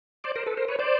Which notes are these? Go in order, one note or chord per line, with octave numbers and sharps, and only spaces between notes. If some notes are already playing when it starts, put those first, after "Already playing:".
C5 D5
A#4 C5
A4 B4
A#4 C5
B4 C#5
C5 D5